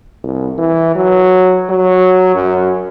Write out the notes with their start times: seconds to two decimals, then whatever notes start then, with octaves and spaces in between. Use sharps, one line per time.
0.24 C2
0.58 E3
0.95 F#3
1.70 F#3
2.35 F#2